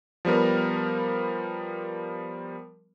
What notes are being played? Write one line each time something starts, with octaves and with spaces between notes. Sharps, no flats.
F3 G3 B3 A#4